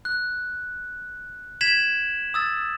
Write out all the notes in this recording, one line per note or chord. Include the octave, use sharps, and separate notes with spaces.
F#6
G#6 B6 E7 F#7
D#6 E6 A6